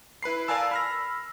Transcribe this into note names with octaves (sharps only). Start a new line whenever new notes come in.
E4 B4 B5 C7
A#4 D5 F5 G#5 A5 E6
B5 F6 A#6